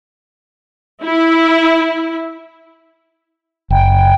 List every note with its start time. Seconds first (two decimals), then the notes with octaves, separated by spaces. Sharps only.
1.02 E4
3.70 F#1 G5